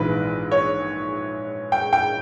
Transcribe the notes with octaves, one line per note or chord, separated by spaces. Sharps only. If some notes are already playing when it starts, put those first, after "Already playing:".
Already playing: A#1 G#2 E3 B4
C#5
G5
G5